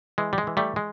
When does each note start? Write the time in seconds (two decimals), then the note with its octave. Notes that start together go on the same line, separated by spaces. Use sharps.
0.18 E3 G#3
0.33 G3
0.38 G#3
0.47 E3
0.57 G3 A3
0.76 G#3